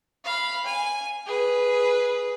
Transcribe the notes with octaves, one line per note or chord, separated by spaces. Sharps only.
F5 B5
G#5
G#4 B4